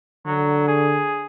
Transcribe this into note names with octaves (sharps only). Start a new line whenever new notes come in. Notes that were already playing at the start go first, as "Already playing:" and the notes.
D3 F#3
G#4